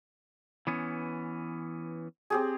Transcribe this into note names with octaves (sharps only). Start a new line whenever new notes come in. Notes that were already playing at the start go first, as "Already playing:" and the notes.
E3 B3 C#4
C4 G4 G#4